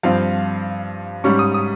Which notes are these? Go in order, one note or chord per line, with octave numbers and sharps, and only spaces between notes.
G2 F3 C4 F5
G#2 G3 C#4 C#6
D#6
D#6